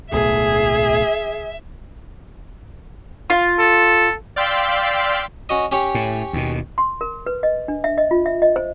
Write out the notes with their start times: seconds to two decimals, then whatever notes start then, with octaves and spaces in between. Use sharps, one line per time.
0.12 D1 B1 A2 G#4 E5
3.30 F4
3.59 A4
4.36 D5 F5 G5 C6 E6 B6
5.49 C#4 F#4 D#5
5.71 C#4 G4 C#5
5.95 A2
6.33 D#2 B2
6.78 C6
7.01 A#4
7.26 B4
7.43 D#5
7.68 D4
7.84 E5
7.98 D#5
8.11 F4
8.26 E5
8.42 D#5
8.56 C5